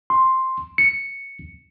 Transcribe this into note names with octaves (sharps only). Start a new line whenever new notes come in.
C6
C#7